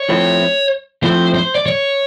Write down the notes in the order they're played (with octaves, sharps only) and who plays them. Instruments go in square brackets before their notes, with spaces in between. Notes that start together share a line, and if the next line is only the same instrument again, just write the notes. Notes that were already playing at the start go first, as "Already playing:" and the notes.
Already playing: [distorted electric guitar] C#5
[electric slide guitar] F3 A3 C4 E4
[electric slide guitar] F3 A3 C4 E4 [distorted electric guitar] C5
[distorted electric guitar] C5
D5
C#5